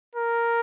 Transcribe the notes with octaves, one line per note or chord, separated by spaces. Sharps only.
A#4